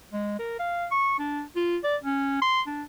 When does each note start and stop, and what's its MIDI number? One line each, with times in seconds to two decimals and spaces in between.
0.12 0.35 56
0.39 0.59 70
0.59 0.86 77
0.91 1.14 85
1.19 1.42 62
1.56 1.77 65
1.84 1.96 74
2.03 2.40 61
2.42 2.62 84
2.67 2.83 62